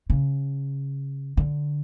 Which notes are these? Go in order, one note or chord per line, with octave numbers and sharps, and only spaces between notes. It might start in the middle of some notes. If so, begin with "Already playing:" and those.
C#3
D3